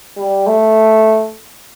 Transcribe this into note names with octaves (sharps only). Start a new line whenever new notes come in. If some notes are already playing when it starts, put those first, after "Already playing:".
G3
A3